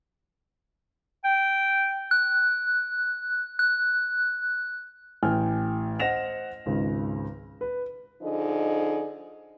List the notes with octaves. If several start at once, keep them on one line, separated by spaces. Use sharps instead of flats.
G5
F#6
F#6
A1 G5 G#5 F6
C5 D#5 F#5 A#6 E7 F7
G#1 C#2 C#3
B4
D3 F3 D#4 G#4 D#5